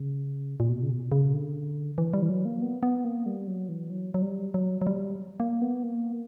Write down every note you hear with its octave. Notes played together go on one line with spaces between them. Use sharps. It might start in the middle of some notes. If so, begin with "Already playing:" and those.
Already playing: C#3
A#2
B2
C#3
B2
C#3
D3
E3
G3
E3
F#3
A#3
B3
B3
A#3
G3
F#3
E3
F#3
F#3
G3
F#3
F#3
G3
A#3
B3
A#3